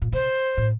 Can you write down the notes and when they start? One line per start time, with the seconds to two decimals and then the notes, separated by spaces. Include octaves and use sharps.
0.02 A#2
0.12 C3 C5
0.57 A2